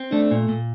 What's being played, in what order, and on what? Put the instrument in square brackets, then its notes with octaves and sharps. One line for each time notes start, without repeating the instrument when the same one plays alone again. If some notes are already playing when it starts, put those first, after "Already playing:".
Already playing: [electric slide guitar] C4
[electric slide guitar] A3 [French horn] D4
[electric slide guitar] A#2
A#2